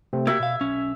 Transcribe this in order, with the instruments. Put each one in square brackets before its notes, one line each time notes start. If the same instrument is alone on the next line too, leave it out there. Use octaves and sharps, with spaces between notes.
[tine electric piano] C3 A3 C4
[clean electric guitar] A#3 F#4 G4 [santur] E5 [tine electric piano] G#6
[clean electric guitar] B2 F5
B1 C#4